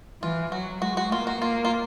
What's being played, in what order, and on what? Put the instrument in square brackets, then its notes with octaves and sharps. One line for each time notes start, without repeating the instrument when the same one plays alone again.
[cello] E3 [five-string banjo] F4
[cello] F#3 [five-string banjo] F#4
[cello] G#3 [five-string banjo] F#4
[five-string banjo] F#4
[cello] A#3 [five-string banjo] F4
[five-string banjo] F#4
[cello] A#3 [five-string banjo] F4
[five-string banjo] F4